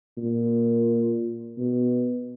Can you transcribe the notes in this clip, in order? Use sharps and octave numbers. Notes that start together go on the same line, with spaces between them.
A#2
B2